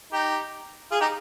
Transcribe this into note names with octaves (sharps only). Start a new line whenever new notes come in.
D#4 G4
F4 G#4
D#4 G4